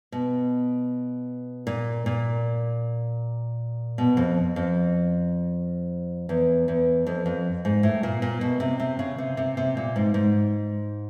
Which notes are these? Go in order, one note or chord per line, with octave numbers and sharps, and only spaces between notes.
B2
A#2
A#2
B2
F2
F2
E2
E2
F2
F2
G#2
A2
A#2
A#2
B2
C3
C3
C#3
C3
C3
C3
A#2
G#2
G#2